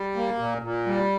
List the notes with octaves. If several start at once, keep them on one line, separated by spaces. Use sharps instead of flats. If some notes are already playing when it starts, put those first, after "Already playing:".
Already playing: G3
A#3
A#2
A#2
G3